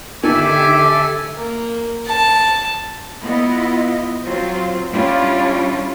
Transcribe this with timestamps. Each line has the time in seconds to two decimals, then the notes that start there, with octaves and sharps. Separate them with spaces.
0.23 D3 D#3 G4 A4 E5 G#5 D6
1.37 A#3
2.06 A5
3.23 B3 E4 F4 D#5
4.22 F#3 C4 F4 C5
4.92 G3 C#4 D4 E4 F4